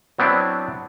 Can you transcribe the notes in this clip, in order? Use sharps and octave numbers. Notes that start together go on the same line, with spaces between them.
F#3 B3 C4 D4 E4